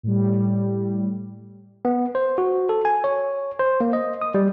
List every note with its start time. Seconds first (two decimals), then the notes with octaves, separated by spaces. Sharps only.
0.03 A2 G3
1.85 B3
2.15 C5
2.38 F#4
2.69 A4
2.85 G#5
3.04 C#5
3.59 C5
3.81 A#3
3.93 D#5
4.22 D#6
4.35 G3